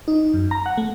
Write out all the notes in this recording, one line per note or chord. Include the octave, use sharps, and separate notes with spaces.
D#4
F#2
A#5
F#5
A3